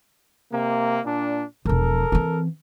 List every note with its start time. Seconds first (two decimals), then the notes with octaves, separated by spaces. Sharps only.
0.51 C3 A#3
1.05 A#2 D4
1.65 E1 F3 A4 A#4
2.12 E3 C4